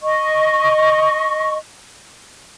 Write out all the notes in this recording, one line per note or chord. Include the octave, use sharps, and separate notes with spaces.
D#5 C#6